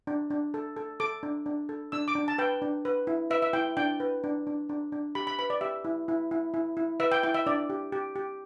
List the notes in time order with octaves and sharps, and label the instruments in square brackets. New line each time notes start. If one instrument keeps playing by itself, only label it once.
[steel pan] D4
D4
A4
A4
A4 D6
D4
D4
A4
D4 E6
D6
D4
A5
B4 G5
D4
B4
E4
B4 E5
E5
E4 G5
D4 G5
B4
D4
D4
D4
D4
G4 B5
B5
B4 B5
D5
G4 E5
E4
E4
E4
E4
E4
B4 E5
G5
E4 G5
E5
D4 D5
G4
G4
G4